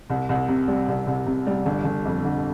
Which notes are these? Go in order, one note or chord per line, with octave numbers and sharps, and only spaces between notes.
C2
C2
C3
G3
C2
C2
C3
G3
G1
G1
F2
D3